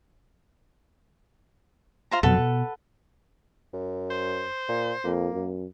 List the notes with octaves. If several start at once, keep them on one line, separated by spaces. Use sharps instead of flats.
F4 C5 A#5
F2 B2 F#3 A4 B4 F#5
B2
F#2
C5
A#2
F2 A#3
F#2